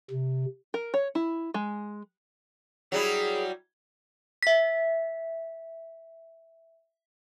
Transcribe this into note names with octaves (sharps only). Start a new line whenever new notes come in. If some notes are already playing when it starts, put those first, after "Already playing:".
C3
A#4
C#5
E4
G#3
F#3 G3 E4 G#4
E5 B6